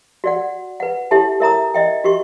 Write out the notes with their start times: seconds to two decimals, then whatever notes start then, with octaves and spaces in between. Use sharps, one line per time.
0.24 F#4 D5 F#5
0.80 B4 F#5
1.11 E4 G4 A4 E5 A5
1.40 A#4 E5 A#5 D#6
1.74 D#5 E5 G5
2.04 F#4 G4 C#6